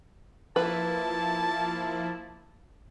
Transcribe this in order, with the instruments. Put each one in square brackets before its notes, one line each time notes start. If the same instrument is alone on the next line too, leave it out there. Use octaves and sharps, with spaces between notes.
[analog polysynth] F3 A#3 E4 [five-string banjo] B4 [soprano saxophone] A5